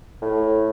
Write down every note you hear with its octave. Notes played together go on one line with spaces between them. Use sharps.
A2